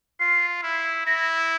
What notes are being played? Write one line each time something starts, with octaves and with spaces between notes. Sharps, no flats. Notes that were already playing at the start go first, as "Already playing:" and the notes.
F4 C7
E4
E4 A#6